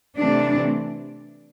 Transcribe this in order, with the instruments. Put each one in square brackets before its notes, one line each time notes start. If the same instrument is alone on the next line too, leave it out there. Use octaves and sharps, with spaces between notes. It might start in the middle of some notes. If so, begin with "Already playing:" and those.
[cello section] C3 E3 A3 C4 D4